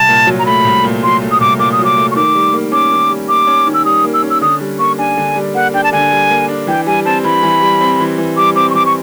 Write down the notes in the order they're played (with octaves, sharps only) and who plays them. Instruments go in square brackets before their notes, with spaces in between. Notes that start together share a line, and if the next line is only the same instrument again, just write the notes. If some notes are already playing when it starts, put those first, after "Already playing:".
Already playing: [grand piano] C2 [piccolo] A5
[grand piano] A#2
F#3
[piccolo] A#5
[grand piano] A3 [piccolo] B5
[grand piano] C2
A#2
[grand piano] F#3 [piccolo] C6
[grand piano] A3
[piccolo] D#6
[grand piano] C2 [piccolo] D6
[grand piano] A#2 [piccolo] D6
[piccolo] D#6
[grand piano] F#3
[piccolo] D6
[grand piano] A3
[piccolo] C#6
[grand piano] D#3 [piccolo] D6
[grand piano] G3
A#3
[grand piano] C#4 [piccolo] D6
[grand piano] D#3
G3
[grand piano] A#3 [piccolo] D6
[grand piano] C#4
D#3
[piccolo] E6
[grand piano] G3 [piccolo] D#6
[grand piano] A#3
[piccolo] E6
[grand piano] C#4
[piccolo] E6
[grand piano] D3 [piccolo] D#6
[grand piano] G3
[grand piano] A#3 [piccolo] C#6
[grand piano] D4 [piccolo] G#5
[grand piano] D3
G3
[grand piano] A#3 [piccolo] F#5
[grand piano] D4 [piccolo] G5
[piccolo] A5
[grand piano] D3 [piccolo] G#5
[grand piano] G3
A#3
D4
[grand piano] E3 [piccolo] G5
[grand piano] G3 [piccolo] G#5
[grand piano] C4 [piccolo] A5
[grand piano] E3 [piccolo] B5
[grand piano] E3
G3
C4
E3
E3
[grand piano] G3 [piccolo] D6
[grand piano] C4 [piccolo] D6
[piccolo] C#6
[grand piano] E3 [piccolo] D6
[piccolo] C#6